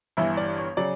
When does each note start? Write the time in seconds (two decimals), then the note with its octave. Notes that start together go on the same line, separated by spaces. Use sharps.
0.17 G1 G2 E3 E5
0.37 D5
0.58 C#5
0.77 C#3 F#3 C#4 D5